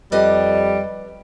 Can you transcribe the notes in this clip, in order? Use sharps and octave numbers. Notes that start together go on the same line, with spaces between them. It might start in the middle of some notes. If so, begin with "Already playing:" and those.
F2 G3 B4 D5 D#5